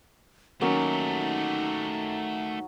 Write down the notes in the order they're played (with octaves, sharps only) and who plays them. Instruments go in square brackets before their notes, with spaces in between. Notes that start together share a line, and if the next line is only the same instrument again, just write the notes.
[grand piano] D#3 A#3 C#4 [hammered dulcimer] F#3 [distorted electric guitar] A3 G4 [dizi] D#4